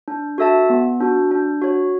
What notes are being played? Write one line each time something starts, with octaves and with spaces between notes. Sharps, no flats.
D4
F#4 A4 E5 A5
B3
D4 F#4
D4
F#4 C#5